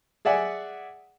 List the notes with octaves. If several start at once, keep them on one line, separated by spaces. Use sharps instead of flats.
G#4 D5 E5 F#5 G#5